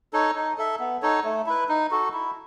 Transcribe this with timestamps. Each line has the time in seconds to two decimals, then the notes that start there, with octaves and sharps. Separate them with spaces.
0.13 D#4 A4 C#5
0.35 D#4
0.58 A4 E5
0.80 B3
1.02 D#4 A4 C#5
1.24 A3
1.46 E4 B4
1.69 D#4
1.91 F#4 A4
2.13 E4